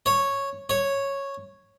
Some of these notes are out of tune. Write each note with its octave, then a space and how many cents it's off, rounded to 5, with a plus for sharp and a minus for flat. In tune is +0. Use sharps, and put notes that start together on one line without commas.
C#5 -5
C#5 -5